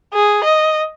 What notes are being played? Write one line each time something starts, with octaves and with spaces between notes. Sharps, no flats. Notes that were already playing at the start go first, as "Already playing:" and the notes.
G#4
D#5